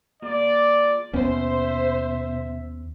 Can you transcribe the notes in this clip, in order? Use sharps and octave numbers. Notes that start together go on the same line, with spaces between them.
A#3 F4 G#4 D5
D#2 B2 B3 C#4 C5 E5